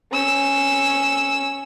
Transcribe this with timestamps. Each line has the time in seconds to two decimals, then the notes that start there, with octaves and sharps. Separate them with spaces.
0.12 C#4 E6